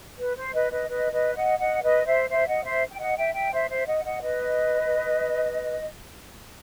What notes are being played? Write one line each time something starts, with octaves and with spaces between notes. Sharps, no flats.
B4
C5
B4 D#5
B4 D#5
B4 D#5
B4 D#5
D#5 F#5
D#5 F#5
B4 D#5
C5 E5
C5 E5
D#5 F#5
C5 E5
G5
D#5 F#5
E5 G5
E5 G5
C5 E5
C5 E5
D#5 F#5
D#5 F#5
B4 D#5